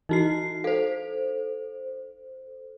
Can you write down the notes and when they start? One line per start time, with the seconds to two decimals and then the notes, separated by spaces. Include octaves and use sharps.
0.09 E3 D#4 E4 F#4 C7
0.64 A4 C5 F5